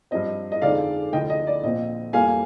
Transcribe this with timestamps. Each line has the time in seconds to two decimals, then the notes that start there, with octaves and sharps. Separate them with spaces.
0.11 G2 F3 C4 D#5
0.52 D#5
0.62 F2 D3 G#3 C4 D#4 D5 F5
1.13 D2 D3 F3 D#5 G5
1.30 D#5
1.47 D5
1.63 A#1 A#2 F3 C4 D#5
2.13 F2 C3 G3 A#3 F5 G#5